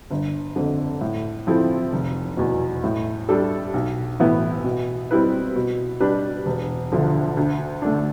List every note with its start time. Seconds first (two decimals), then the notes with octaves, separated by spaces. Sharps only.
0.10 G1
0.56 F2 D3
1.01 A2
1.47 F3 C4 E4 A4
1.93 F1
2.37 E2 B2
2.84 A2
3.29 G3 D4 A4
3.74 B1
4.20 A2 E3 B3 E4
4.64 B2
5.11 G3 C4 E4 B4
5.56 B2
6.00 G3 D4 G4 B4
6.46 E1
6.92 D2 D3 F3
7.37 D2
7.82 D3 A3 D4